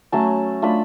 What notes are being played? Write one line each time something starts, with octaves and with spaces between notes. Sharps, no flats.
F#3 A3 C#4 A5
A3 D4 F4 B5